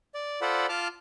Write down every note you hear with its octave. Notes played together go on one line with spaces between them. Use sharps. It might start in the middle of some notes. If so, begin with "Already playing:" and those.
D5
F4 A4 C5 D5 F#5 B5
F4 A5 D6 F6